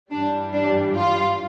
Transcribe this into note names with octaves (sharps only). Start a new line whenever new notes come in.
G2 E3 G3 D4
D4
F4